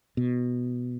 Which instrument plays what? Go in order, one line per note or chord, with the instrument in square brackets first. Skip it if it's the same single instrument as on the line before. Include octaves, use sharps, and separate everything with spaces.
[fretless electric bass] B2